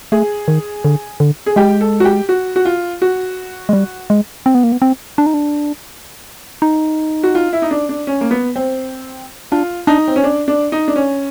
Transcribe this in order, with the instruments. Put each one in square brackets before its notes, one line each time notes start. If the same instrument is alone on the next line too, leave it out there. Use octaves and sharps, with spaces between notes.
[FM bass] A3 [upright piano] G#4
[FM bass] D#3
D3
D3
[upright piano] G#4
[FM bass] G#3 [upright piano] G4
[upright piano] A4
F#4
G4
F#4
F#4
F4
F#4
[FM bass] G#3
G3
G#3
C4
B3
A#3
B3
C4
D4
D#4
D4
D#4
[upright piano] F#4
F4
E4
D#4
D4
D4
C#4
A#3
B3
C4
[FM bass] D4 [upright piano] F4
[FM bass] D4 [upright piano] D#4
[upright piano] C4
C#4
D4
D4
D#4
D4
C#4